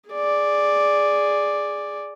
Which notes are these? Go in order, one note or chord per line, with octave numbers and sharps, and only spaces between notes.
G#4 D5